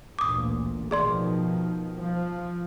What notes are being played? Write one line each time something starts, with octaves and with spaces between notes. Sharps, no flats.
A1 D2 A#2 D6 D#6
B2 D#3 F3 G#4 D5 C6
F3